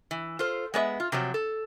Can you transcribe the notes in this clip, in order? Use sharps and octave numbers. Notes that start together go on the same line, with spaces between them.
E3
F4 A4 C5
G#3 B3 C#5 E5
F4
C3 F3 F#3
A4